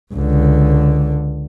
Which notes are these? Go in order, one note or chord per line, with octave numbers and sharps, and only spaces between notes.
C#2 D3